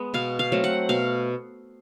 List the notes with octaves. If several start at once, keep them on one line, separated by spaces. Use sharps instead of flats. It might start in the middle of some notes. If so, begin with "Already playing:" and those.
Already playing: G#3 B3
B2 F5
F5
F#3 A3 C4
F#5
B2 F5